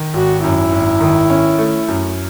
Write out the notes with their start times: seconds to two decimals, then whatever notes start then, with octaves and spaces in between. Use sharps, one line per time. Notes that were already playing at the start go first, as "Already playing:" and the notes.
Already playing: D#3
0.14 G#1 F#4
0.44 F#2 E4
0.72 G#1
1.01 D#3
1.30 C#4
1.58 A3
1.88 F#2